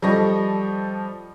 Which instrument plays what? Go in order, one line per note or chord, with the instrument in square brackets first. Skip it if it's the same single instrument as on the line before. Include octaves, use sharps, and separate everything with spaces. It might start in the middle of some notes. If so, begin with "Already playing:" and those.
[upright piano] F3 G3 A4 D#5 C#6 A#6